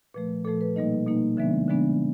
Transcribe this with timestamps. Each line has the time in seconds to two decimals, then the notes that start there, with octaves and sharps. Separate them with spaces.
0.14 A#2 F3 A3 B4
0.45 A#2 F3 A3 A4
0.61 B4
0.76 B2 G3 A#3 D#4 D#5
1.07 B2 G3 A#3 D#4
1.37 D3 F3 G#3 B3 D4 E5
1.68 D3 F3 G#3 B3 D4